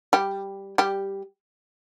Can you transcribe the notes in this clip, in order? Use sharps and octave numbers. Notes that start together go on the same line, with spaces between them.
G3 G4
G3 G4